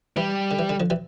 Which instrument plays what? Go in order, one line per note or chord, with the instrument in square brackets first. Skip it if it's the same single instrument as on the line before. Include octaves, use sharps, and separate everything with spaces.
[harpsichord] E3 [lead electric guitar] G3
[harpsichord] D3
E3
D3
D3 F3
E3 G3